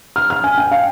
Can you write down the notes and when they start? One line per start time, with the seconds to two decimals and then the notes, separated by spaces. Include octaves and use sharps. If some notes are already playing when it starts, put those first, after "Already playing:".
0.16 F6
0.30 F6
0.44 G#5
0.58 G5
0.71 F5